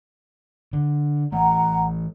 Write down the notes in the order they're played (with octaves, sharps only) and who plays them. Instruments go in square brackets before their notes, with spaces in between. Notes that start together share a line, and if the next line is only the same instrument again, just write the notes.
[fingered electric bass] D3
[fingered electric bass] E3 A3 [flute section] F#5 A#5